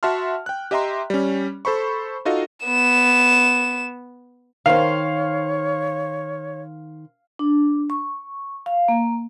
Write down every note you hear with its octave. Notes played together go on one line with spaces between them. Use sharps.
F#4 E5 F#5 A5 C6 F6
G5 F#6
G4 D#5 E5 G5 A#5 C6
G3 C#4
A4 C5 B5 C#6
D#4 F4 F#4 A4 D#5 F5
B3 E7
D#3 C5 C#5 F5
D4
C#6
F5
A#3